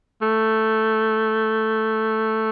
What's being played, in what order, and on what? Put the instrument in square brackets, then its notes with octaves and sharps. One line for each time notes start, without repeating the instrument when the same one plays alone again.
[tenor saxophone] A3